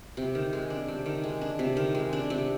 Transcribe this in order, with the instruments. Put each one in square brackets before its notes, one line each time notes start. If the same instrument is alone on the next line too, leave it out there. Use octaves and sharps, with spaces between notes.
[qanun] C3
D#3
G#3
D4
C3
D#3
G#3
D4
C3
D#3
G#3
D4
C3